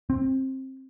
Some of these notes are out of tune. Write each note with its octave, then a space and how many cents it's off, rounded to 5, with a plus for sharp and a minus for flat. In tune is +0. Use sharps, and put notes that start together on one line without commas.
C4 +20